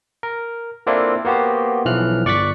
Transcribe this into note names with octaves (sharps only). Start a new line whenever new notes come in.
A#4
A#3 C4 D4 E4 F4 A4
A#3 B3 F#4 G4 C5
B1 E3 F3 F6 F#6
G1 D5 C#6 F#6 A6 B6